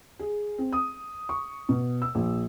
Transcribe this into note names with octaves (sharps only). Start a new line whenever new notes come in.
G#4
C4
D#6
C#6
B2
E6
A#1